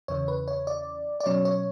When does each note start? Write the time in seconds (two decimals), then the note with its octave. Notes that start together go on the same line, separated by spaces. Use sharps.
0.08 E2 C#3 E3 C#5
0.28 B4
0.48 C#5
0.67 D5
1.20 D5
1.26 B2 F#3 C#4 C#5
1.45 C#5